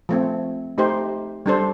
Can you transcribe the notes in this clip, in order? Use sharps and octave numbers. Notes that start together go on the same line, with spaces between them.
F3 A3 C4
A3 D#4 G4 C5
G3 D4 A4 C5